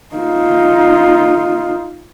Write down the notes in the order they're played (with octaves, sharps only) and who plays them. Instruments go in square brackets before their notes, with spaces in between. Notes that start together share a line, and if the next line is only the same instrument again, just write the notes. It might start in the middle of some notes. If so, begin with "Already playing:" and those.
[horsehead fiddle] D#4 F4